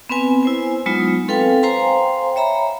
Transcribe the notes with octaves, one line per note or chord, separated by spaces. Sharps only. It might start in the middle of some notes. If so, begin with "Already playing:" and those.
B3 C4 B4 G#5
E4 C5 G#5
F#3 G#3 B3 D#4 F4
C4 A4 B4 F5 G5 G#5
C5 F5 G5 G#5 A#5 C6
C#5 E5 A#5 B5